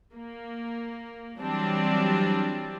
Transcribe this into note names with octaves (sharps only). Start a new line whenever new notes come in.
A#3
E3 F#3 G3 C4 D4